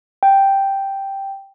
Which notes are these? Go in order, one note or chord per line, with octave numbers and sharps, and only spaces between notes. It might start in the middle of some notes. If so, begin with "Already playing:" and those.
G5